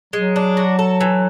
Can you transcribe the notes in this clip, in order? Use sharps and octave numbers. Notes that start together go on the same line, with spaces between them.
F#3 G#3
D4
F#4
A4
E3